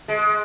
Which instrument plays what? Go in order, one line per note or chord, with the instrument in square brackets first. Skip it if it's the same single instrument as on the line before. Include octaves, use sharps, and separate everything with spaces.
[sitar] G#3